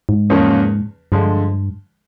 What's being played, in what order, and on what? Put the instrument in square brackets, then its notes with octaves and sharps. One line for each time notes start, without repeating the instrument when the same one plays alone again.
[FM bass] G#2
[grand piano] E2 C#3 F3 A#3 C#4
[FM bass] G2 [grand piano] D3 F3 G#3